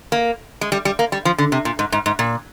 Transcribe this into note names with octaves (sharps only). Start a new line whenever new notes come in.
A#3
G#3
G3
G3
A#3
G3
F3
D3
C3
A#2
G#2
G#2
G#2
A#2